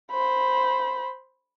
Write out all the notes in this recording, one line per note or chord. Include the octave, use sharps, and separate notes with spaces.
C5 B5